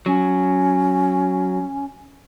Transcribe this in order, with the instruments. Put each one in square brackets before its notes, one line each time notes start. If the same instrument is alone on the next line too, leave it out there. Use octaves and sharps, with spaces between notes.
[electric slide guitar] F#3 [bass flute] C#4